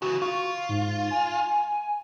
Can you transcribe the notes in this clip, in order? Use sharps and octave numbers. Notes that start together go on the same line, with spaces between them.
C#3 E3 F#4
F4 C#6
G#2
G#5